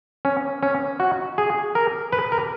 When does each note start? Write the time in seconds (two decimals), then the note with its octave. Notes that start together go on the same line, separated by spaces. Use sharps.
0.25 C#4
0.63 C#4
1.00 F#4
1.38 G#4
1.75 A#4
2.13 B4
2.32 A#4